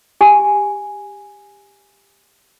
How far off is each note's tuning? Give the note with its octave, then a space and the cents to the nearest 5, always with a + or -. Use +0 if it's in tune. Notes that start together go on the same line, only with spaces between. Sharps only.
G4 +15 G#5 +0